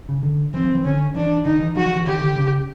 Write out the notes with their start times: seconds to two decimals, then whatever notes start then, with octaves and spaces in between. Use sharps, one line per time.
0.09 C#3
0.23 D3
0.54 E3 C4
0.64 F3
0.75 E3
0.85 D3 C#4
1.15 E3 D4
1.45 D#3 D#4
1.60 E3
1.76 F3 F#4
1.86 F3
1.96 E3
2.06 D#3 G4
2.22 D3
2.36 C#3